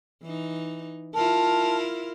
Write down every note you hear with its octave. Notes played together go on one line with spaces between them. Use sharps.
E3 D#4
E4 F4 A#4 A5